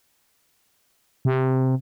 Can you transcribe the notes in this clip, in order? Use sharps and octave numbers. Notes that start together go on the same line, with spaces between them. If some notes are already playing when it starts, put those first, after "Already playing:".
C3